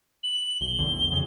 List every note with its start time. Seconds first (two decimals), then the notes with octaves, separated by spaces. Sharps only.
0.23 F#7
0.61 B1 G7
0.79 A#1 E2 D3
1.12 F2 C#3